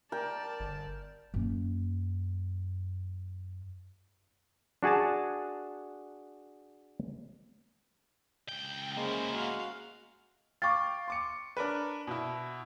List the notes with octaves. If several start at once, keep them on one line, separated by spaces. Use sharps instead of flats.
A#4 D5 G5 A5
G1
F#2 A#3
D4 F#4 G#4 G#5 A5
C#2 G5
G#3 A#3 C#4 E4 C5
F#4 F5
F5 G5 C#6 D6 A6
C6 D6 C#7
D4 A#4 B4
B2 E4